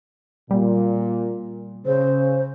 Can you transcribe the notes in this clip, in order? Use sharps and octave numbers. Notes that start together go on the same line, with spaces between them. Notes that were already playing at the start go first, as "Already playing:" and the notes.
A#2 G3
C#3 C5